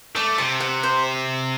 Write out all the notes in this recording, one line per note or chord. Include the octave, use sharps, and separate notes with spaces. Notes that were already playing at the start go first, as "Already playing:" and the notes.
A3 D5
C3 A5
F#5
C5